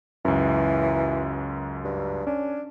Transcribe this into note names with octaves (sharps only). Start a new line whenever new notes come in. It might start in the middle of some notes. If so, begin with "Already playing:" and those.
C#2 F#2 E3
G2
C#4 D4